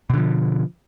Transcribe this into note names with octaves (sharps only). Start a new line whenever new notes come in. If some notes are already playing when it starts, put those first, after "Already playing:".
B2 D3 F3